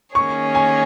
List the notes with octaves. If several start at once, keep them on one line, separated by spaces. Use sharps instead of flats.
D#3 A#3 C#4 G#4 C#5 C#6
G#5